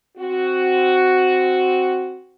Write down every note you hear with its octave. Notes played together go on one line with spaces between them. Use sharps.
C4 F#4